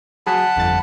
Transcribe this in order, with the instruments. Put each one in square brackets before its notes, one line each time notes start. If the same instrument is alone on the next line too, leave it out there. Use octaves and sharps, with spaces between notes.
[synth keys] F#3 G#4 [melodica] F#5 A5 B5
[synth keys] G1 F2 A6